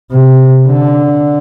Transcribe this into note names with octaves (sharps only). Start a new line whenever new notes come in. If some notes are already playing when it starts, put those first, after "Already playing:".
C3
D3